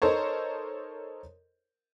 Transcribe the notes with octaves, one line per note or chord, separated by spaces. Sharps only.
D#4 A4 A#4 C5 C#5